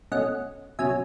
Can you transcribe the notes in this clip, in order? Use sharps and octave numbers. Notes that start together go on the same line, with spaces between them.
B2 A3 C#4 D#5 F#5
C#2 B2 F#3 C#4 E5 G#5